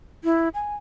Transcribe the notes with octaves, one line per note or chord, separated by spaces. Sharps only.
E4
G#5